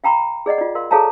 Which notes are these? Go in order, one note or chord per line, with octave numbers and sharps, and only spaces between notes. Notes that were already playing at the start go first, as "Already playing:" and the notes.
F5 G5 A#5 B5 C#6
G#4 D5 D#5 F#5
F4 D5
A#4 F5 C6
G#4 A4 C#5 F5 A5 A#5